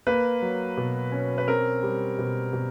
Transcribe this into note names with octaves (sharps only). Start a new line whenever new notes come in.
A#3 B4
F#3
B2
C#4
B4
C4 A#4
G3
B2
B2